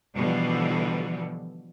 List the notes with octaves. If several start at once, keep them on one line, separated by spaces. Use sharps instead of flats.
B2 D3 E3 F3 G3